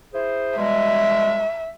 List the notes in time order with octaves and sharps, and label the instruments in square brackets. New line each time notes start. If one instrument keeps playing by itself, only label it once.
[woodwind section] E4 G#4 C5
[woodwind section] B2 G3 G#3 [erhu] E5